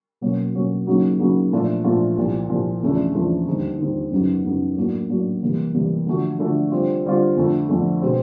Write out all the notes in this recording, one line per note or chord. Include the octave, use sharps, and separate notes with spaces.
B2 F#3 A#3 C#4 F#4
B2 F#3 A#3 C#4 F#4
C#3 F#3 A#3 D#4 F#4
C#3 F#3 A#3 D#4 F#4
A#2 F3 A3 D4 F4
A#2 F3 A3 D4 F4
C2 A#2 F3
C2 A#2 F3
E2 C#3 F3 A3 D4
E2 C#3 F3 A3 D4
D#2 D3 G3 C4 D#4
D#2 D3 G3 C4 D#4
F#2 C#3 F#3 B3 D#4
F#2 C#3 F#3 B3 D#4
A2 F#3 A#3 D4 F#4
A2 F#3 A#3 D4 F#4
C3 E3 G3 A#3
C3 E3 G3 A#3
D3 F3 A3 D4 F#4
D3 F3 A3 D4 F#4
D3 G3 C4 F4
D3 G3 C4 F4
F2 D3 F3 A3
F2 D3 F3 A3
B2 G#3 C4